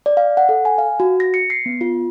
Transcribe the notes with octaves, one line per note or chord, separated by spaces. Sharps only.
D5
F5
F#5
A4
G#5
F5
F#4
A#6
C#7
C7
B3
F4